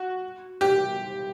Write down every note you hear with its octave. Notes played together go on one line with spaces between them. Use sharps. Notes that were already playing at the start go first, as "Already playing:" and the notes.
Already playing: F#4
G4